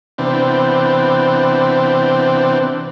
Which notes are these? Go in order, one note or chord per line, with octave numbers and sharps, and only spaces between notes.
C3 E3 B3 C4 D4